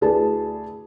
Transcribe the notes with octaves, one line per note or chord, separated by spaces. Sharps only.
D2 E4 G#4 B4 D5 A5